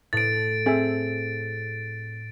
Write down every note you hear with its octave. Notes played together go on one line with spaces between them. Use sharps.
A2 A6 D7
C4 G#4 A4 E5